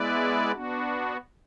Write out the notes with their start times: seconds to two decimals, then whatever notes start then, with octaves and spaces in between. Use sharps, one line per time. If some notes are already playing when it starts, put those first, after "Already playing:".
Already playing: G#3 B3 E4 B4 D5
0.51 B3 D4 F#4